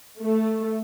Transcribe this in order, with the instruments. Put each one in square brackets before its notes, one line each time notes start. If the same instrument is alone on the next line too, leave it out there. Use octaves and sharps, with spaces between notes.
[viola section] A3